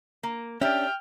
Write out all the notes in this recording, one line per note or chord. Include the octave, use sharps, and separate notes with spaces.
A#3
C#4 D4 G4 E5 G5 F6